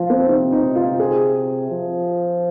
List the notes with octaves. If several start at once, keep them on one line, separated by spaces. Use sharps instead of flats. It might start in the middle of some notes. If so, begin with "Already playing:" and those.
Already playing: F3 F4
C4
C3 D#4
D#4
F4
G#4
F3